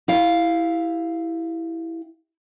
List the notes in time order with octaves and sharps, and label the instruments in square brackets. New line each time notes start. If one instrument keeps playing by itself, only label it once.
[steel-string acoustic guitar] E4 G4 F5